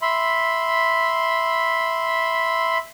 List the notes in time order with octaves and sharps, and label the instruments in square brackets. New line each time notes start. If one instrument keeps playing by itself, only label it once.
[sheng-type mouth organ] E5 B5 C6